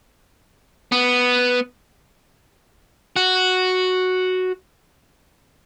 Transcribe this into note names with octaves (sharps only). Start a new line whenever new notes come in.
B3
F#4